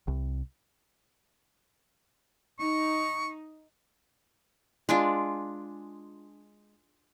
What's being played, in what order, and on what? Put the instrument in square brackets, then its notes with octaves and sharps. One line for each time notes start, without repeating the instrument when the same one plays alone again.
[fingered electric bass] C2
[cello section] D#4 [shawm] C#6
[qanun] G#3 D4 F4